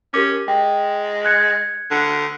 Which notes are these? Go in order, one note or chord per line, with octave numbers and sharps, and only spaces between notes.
C#4 G4 A#4 D6
G#3 G5
F#6 G#6 C#7
D3